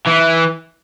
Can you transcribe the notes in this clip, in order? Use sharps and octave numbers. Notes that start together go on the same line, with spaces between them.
E3